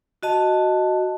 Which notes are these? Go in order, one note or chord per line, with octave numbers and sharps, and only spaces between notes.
F#4 D#5 A5